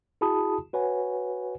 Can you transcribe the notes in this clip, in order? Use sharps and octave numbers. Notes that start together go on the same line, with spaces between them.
E4 F#4 G#4 A5 B5 D#6
F#4 B4 C#5 F#5 G#5